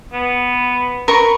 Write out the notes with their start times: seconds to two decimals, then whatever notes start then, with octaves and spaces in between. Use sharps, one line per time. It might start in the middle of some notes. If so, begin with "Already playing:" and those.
0.13 B3
1.08 A#4 B4 C#6